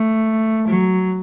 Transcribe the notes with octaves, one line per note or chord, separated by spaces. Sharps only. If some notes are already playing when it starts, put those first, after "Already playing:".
Already playing: A3
F#3